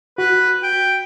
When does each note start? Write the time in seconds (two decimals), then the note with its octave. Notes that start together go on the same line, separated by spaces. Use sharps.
0.18 F#4 B4
0.64 G5